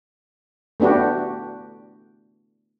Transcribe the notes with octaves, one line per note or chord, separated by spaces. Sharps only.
A3 B3 D4 F#4 G4